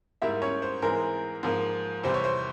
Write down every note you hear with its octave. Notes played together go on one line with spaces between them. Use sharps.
G#2 G3 A#3 E4 E5
C#4 C#5
C5
G#2 E3 G#3 C4 A#4
G#2 F3 A#3
E2 C3 G3 C4 C5
C#5
C5